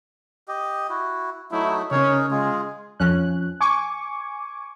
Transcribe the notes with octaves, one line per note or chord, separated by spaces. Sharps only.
G4 D#5
E4 F#4
F#3 A3 D#4 E4
C#3 C#4 D#4 G#4 A#4 C#5
G#3 F4 G#4
F2 F3 C#4 F#6
G#5 C#6 D6